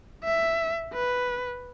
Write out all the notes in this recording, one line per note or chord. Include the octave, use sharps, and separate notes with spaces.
E5
B4